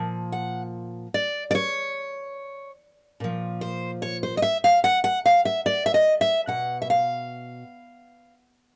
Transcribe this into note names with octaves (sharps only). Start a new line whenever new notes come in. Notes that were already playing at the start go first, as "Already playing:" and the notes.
Already playing: A#2 F3
F#5
D5
D5
C#5
A#2 F3
C5
C#5
C5
D#5
E5
F5
F#5
F#5
F5
E5
D5
E5
D#5
E5
B2 F#5
E5
F5